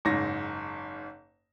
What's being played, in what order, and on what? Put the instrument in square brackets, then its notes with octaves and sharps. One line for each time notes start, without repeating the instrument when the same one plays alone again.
[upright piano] F#1 G#2 A#6